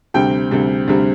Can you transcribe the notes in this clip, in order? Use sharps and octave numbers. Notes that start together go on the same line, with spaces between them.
D2 C3 G3 G5
D2 C3 G3
D2 C3 G3